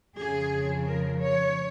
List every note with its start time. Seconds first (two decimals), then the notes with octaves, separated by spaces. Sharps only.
0.17 F2 C#3 F3 G#4
0.85 A#4
1.19 C#5